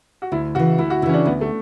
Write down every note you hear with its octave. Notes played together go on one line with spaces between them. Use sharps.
F#4
D2 E4
C#3 E3 F#4
D2 E4
F#4
C#3 E3 C#4 E4
D4
D2 B3
A3